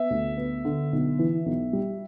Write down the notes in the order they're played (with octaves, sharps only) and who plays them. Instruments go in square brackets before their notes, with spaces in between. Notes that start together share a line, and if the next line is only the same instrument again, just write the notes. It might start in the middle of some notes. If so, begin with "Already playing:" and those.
Already playing: [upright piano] B3 [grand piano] E5
[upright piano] D2
B3
D3
B1
E3
B1
G3